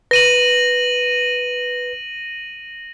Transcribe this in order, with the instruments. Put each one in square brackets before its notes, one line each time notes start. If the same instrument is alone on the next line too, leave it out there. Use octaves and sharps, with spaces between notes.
[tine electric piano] B4 [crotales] A#6 D#7 F#7